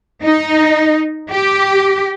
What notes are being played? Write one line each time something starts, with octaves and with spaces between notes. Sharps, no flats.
D#4
G4